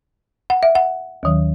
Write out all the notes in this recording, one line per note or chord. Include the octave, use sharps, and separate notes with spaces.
F#5
E5
F#5
D#2 D#3 F#3